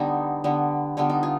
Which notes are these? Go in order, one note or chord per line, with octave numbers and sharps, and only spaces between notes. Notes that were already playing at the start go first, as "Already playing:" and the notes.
Already playing: D3 G3 B3 D#4
D3 G3 B3
D3 G3 B3 F4
D#4
F4